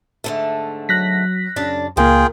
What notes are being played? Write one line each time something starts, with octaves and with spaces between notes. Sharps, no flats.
G#2 D3 A3
F#3 F#6 A#6 B6
F#2 C#3 D4 D5
C#2 A#2 A#3 F4 G#4 A#4 G5